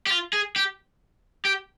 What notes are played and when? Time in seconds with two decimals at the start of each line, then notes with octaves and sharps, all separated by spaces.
0.06 G4
0.10 F4
0.33 G#4
0.56 G4
1.45 G4